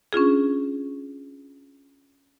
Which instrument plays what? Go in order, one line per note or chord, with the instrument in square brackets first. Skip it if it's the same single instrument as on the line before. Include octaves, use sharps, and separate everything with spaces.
[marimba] C#4 D4 F4 G#4